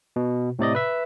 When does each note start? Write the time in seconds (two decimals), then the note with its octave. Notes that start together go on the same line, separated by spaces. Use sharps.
0.16 B2
0.59 A2 C3 D5 D#5
0.75 B4 E5